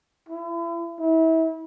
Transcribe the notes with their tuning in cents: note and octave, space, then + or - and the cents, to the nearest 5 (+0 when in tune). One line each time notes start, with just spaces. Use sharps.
E4 +40
E4 -30